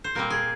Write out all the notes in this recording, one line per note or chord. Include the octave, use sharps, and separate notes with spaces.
C5
A#2 G3 C4 A#4
G#4